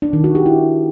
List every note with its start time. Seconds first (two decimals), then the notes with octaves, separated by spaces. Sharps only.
0.02 D4
0.13 D#3
0.24 F#4
0.35 G4
0.46 E4